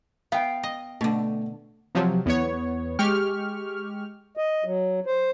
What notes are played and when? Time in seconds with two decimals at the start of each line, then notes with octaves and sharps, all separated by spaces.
0.32 B3 F5 G5
0.63 D#5
1.01 B2 D3 A3
1.95 C3 F3 F#3
2.26 E2 B3 C#5
2.99 G#3 G4 C#6 F6
4.37 D#5
4.64 F#3
5.06 C5